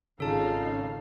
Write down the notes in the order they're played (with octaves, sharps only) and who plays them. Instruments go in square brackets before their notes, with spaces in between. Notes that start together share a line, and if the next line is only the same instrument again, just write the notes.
[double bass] G#1 [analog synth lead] C#3 [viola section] D#4 F4 F5 [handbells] A4 A5